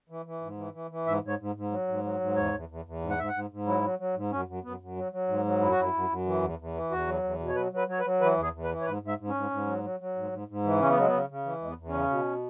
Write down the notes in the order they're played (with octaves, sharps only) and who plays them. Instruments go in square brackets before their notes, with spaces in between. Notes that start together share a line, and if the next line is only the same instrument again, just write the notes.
[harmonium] E3
E3
G#2
E3
E3
E3
G#2 E5
G#2
C#5
G#2
G#2
F#3
G#2
F#3
G#2
E2 C#5
E2
E2
E2
G#2
F#5
G#2 E5
F#5
G#2
G#2
F#3 E4
F#3
F#3
G#2
F#2 C#4
F#2
F#2 B3
F#2
F#3
F#3
G#2
F#3
F#2 E4
F#4
F#2 E4
F#2
F#2
E3
E2
E2
E3
E2 F#4
F#3
E2
B2
C#5
F#3 B4
F#3 B4
F#3 C#5
B4
F#3
E3 B4
E2 G#4
E2
B4
E3
C#5
G#2 B4
G#2
E5
G#2
C#4
G#2
G#2
F#3
F#3
F#3
G#2
G#2
G#2
E3
C#3 C#4
B3
F#3 G#3
B3
C#3
C#3
E3
E2 G#3
B3
E2
C#4
C#3
B2